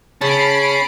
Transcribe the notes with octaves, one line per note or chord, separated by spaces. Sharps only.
C#3 C#4 A5 B5 C7 D7